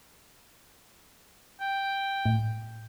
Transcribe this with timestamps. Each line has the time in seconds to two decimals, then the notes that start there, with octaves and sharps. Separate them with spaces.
1.61 G5
2.26 A2